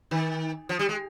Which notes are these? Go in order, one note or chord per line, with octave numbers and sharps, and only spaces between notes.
D#3
F3
G3
G#3